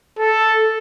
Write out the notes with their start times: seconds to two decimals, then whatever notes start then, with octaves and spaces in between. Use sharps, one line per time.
0.19 A4